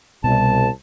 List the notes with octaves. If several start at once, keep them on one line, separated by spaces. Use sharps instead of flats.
C2 B2 A5